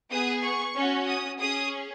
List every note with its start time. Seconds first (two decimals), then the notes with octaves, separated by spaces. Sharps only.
0.11 B3 G#4 D#6
0.43 C#6
0.75 C#4 F#4
1.08 D#6
1.40 C#4 G#4 D#6